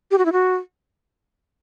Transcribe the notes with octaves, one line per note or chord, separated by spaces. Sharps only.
G4
F#4
E4
F#4